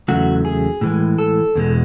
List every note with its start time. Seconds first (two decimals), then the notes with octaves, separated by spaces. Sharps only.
0.08 E2 C#3 F#3 A3 F#4
0.45 G#4
0.81 A2 E3 G#3
1.18 A4
1.55 E2 B2 G#3